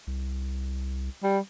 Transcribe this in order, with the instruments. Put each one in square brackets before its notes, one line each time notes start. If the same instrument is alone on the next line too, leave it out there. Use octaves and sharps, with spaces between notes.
[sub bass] C2
[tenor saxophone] G3